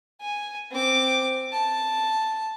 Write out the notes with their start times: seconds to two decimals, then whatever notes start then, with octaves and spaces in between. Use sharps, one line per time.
0.21 G#5
0.71 C4 D6
1.53 A5